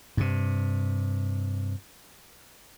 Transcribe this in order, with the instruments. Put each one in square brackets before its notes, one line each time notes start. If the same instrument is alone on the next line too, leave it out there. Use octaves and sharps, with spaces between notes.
[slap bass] G2 C3